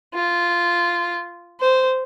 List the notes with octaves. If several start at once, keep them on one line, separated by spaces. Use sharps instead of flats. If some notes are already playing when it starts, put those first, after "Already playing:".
F4
C5